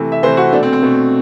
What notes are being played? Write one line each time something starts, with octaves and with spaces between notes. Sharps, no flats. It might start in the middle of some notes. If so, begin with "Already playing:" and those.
Already playing: C3 E3 A3
E5
C3 E3 A3 C5
F#4
B2 A3 D4
C4
C4
B2 A3